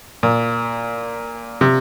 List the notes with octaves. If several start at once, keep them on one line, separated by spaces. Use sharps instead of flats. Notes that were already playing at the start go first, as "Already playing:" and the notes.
A#2
C3